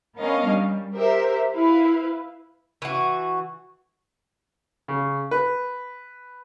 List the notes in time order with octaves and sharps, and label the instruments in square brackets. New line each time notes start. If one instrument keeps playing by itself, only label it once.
[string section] B3 C#4 D4 A#4 D#5 F5
G3
G4 A#4 C5 E5
E4 B4 F5
[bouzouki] E3 F#4
[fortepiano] C#3
B4